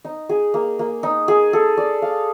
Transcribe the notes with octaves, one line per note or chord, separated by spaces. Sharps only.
D#4
G#4
A#3
A#3
D#4
G#4
A4
D5
F5